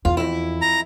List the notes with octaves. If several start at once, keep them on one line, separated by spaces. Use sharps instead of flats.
E2 F4
F2 E4
A#5